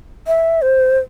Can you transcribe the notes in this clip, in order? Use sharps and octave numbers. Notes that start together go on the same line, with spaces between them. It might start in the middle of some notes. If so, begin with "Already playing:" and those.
E5
C5